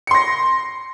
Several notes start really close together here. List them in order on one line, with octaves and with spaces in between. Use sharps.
C#7 C6 A#6